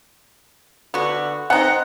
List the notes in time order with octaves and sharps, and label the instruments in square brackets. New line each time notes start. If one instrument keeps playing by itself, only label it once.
[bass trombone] D3 [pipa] B3 F#4
[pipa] B3 D#4 [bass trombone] C4 [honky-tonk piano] F#5